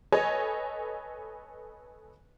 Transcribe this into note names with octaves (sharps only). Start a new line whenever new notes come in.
A4 B4 C#5 D#5 G#5